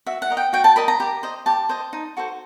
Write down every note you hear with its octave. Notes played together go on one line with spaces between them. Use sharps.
F#4 E5
F#5
A#4 D#5
G5
F#4 G5
A5
A#4 D#5 B5
A#5
G4
C5 D#5
G4 A5
C5 D#5
D#4
F#4 A4 C5